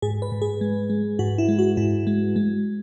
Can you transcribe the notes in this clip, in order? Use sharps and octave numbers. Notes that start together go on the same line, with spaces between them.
G#2 G#4
B4
G#2
G#4
G#3
G#3
G#2 F#4
E4
G#3
F#4
G#2 E4
G#3
G#3